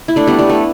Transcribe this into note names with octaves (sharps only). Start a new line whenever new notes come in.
E4
A3 D4
G3 B3
G3 B3
A3